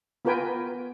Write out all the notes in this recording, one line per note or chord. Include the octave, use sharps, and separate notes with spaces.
B3 F4 A#4 B4 G5 G#5